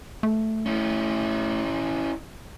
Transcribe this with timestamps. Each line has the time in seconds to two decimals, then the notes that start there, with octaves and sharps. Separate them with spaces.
0.23 A3
0.66 C#4 E4